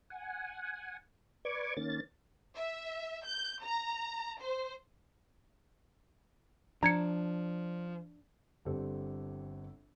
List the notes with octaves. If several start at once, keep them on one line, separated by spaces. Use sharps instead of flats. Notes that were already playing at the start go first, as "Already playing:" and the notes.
F#5 G#5
B4 D5 C#6 D6 G#6
D#3 A#3 C#4 A6
E5
G6
A#5
C5
F3 D4 A#5 G#6 C#7
G1 D3 G3 C4 G4 A4